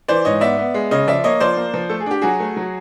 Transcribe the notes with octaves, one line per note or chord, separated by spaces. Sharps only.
E3 C5 D5
G#2 C#5 D#5
B3 D5 E5
B3
G#3
C#3 C#5 D#5
F3 D5 E5
A#3 C#5 D#5
F3 C5 D5
A#3
F3
A3 A4
G#4
D4 G4
F#3 F#4 G#4
A3
F#3